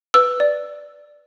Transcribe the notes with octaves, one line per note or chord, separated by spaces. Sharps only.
B4 E6
D5